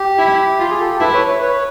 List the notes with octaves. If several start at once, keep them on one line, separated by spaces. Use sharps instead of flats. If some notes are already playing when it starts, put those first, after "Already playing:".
Already playing: G4
E4
F4
G#4
G4 A4
E4 A4 B4
B4 C#5
B4 C#5
B4 C#5